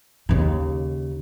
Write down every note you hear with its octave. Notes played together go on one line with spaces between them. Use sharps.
D#2 C#3